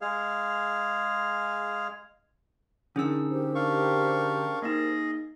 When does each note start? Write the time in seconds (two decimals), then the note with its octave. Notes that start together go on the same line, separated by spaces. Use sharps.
0.01 G#3 G#4 F5
2.96 D3 D#3 C#4 G#4 E6
3.29 G4 A#4 C5
3.55 D4 F5 C#6
4.62 A#3 D#4 G#4 D#5